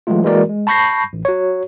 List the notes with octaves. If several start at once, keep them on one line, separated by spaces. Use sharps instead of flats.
E3 F#3 G#3 A3 F4
E3 G#3 A#3 F#4 A#4 D5
G#3
A5 B5 C#6 G6 A#6 C7
A1
F#4 C#5